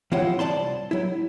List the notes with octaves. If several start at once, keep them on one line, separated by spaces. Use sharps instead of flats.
E3 C4 E4 F4 C#5 F#5
C2 F#3 D5 A5 C6
F#3 E4